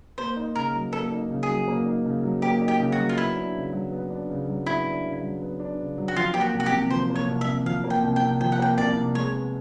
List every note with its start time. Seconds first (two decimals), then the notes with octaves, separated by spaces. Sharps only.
0.18 A#3 C5
0.37 D#4
0.55 C#3 A#4
0.74 F#3
0.93 A#3 A4
1.11 D#4
1.30 C#3
1.43 G#4
1.49 F#3
1.68 A#3
1.86 D#4
2.06 C#3
2.23 F#3
2.42 A#3 G4
2.61 D#4
2.68 G4
2.80 C#3
2.92 F#4
2.98 F#3
3.09 F4
3.18 B3 E4
3.36 D4
3.55 C#3
3.73 F#3
3.92 B3
4.10 D4
4.30 C#3
4.48 F#3
4.66 B3 E4
4.86 D4
5.04 C#3
5.23 F#3
5.42 B3
5.60 D4
5.79 C#3
5.98 F#3
6.08 F#4
6.16 F3 F4
6.34 A#3 G4
6.41 F#4
6.54 C2
6.60 F#4
6.66 G4
6.72 C3
6.90 F3 C5
7.10 A#3
7.16 C#5
7.28 C2
7.41 E5
7.47 C3
7.66 F3 F5
7.84 A#3
7.90 G5
8.03 C2
8.16 G5
8.22 C3
8.41 F3 G5
8.52 F#5
8.60 A#3 G5
8.78 C2 D5
8.96 C3
9.15 G#3 C#5
9.34 B3